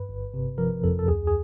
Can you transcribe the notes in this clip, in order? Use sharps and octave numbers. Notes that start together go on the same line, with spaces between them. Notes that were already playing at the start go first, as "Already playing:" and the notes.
Already playing: G2 B4
G1
C3
F3 A#4
F2 A4
A4
D2 G#4
G#4